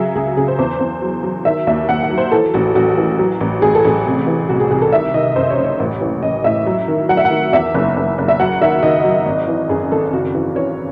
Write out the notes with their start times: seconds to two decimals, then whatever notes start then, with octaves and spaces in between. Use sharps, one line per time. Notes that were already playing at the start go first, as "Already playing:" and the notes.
Already playing: C#3 F#3 G#4 E5
0.15 C#2 G#4
0.37 C#3 G#4
0.48 C5
0.59 E2 C5
0.80 E2
1.02 F#3
1.23 F#3
1.45 D#3 E5
1.67 D#2 E5
1.89 D#2 F#5
2.03 F#5
2.10 F#3
2.18 C5
2.32 E3 A4
2.54 A1 F#4
2.75 A1 F#4
2.97 E3
3.19 F#3
3.41 A1
3.62 A1 G#4
3.75 A4
3.85 A1 G#4
4.06 C3
4.27 E3
4.49 C2 F#4
4.60 G#4
4.71 C2 G#4
4.82 A4
4.92 D#3 E5
5.14 D#3 D#5
5.36 F#2 C5
5.50 C#5
5.57 F#1
5.64 C#5
5.80 A1
6.01 E3
6.23 A1 D#5
6.44 A2 E5
6.66 F#3
6.88 D#3
7.09 F#3 F#5
7.17 E5
7.25 F#5
7.31 D#3
7.53 E2 E5
7.74 F#1
7.96 F#1
8.18 F#1
8.28 E5
8.40 F#3 F#5
8.61 D#3 E5
8.83 D#3 D#5
9.04 F#3
9.26 G#1
9.48 E3
9.69 F#2 G#4
9.92 G#1 A4
10.13 C#3 F#4
10.34 E3 F#4
10.56 E3 C#5